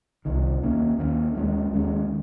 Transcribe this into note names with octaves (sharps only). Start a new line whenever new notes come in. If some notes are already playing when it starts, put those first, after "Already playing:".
C2 C3 D#3
D#2 D#3 A#3 C#4
D#2 D#3 A#3 C#4
D#2 D#3 G#3 C#4
D#2 D#3 G#3 C#4